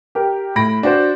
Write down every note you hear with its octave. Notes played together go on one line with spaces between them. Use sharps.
G4 A#4
A2 B5 A#6 D7
D4 F#4 C5